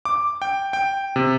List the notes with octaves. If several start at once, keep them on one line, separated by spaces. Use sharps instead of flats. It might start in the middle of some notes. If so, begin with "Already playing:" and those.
D6
G5
G5
C3